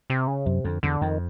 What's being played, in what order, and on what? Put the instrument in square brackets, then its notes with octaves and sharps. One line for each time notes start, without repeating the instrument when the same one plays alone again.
[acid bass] C3
C#3
[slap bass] F#2 [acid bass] C3
[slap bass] F2 [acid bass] D3
[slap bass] E2 [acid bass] D3
[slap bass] F2 [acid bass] D#3